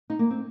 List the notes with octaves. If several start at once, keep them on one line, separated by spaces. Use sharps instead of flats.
D#4
A#3
C4